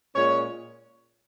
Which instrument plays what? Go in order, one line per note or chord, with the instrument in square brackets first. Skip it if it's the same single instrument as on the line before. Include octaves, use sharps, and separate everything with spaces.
[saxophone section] A#2 G#3 C#4 C#5